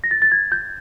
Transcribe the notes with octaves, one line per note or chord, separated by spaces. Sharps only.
A#6
A6
A6
G#6
G6